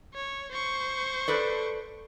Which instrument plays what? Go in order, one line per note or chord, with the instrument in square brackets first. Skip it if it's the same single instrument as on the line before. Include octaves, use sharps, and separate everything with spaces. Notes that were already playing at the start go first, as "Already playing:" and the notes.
[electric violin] C#5
C5 C#6
[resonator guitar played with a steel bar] A4 B4 D5